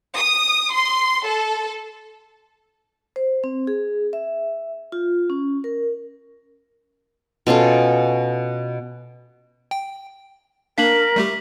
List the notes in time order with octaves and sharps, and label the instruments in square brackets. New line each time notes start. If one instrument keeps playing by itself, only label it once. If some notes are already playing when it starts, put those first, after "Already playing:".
[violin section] D#6
C6
A4
[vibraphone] C5
C4
G#4
E5
F4
C#4
A#4
[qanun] B2 C#4 F4 A4
[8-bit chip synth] G5
[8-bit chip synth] A#3 D4 F5 [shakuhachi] A#4 [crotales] B6 F#7
[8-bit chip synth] G3 A3 G4